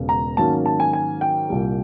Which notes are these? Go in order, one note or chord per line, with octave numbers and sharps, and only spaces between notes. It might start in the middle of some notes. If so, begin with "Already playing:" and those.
Already playing: E1 E2 C#3 F3 G#3
A#5
G#2 D#3 F#3 A#3 C#4 A5
A5
G#5
G#5
G5
C2 A#2 G3